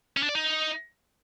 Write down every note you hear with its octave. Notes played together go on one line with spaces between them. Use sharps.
C#4
D4
D5
D#4